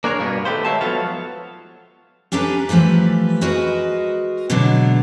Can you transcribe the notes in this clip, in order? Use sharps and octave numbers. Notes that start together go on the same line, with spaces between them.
A#3 D4 G#4 A#4 C#5
G2 B2 A#3 B3
D#3 A3 G4 B4 C5
G#3 C#5 E5 F5 A5
F3 F#3 B3 A4 C#5 F5
C#4 D4 G4 A4 B4 A#5
E3 F3 G3 A3 B4
G#3 F#4 A#4 B4 D#5
B2 D3 F#3 G#3 D4